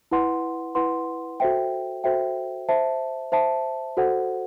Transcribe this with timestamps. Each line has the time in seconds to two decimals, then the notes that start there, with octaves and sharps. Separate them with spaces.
0.11 E4 B4 F#5 C6
0.75 E4 B4 F#5 C6
1.40 F#4 A4 C5 E5 G5
2.04 F#4 A4 C5 E5 G5
2.69 C5 E5 A5
3.32 C5 E5 A5
3.97 F#4 A4 C5 F#5